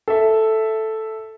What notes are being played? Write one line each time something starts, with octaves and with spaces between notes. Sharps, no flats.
A4 E5